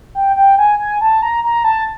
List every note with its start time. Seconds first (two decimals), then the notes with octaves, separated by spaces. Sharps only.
0.15 G5
0.36 G5
0.58 G#5
0.79 G#5
1.01 A5
1.22 A#5
1.44 A#5
1.64 A5